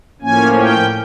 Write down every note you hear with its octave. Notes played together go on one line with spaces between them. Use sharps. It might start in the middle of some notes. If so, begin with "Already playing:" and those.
A2 F3 A#3 C#4 G#5
G5